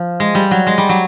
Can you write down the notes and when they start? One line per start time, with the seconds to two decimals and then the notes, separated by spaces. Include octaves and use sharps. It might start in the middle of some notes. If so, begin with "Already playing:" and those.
Already playing: F3
0.20 G#3
0.35 G3
0.51 F#3
0.67 G#3
0.78 G3
0.89 F#3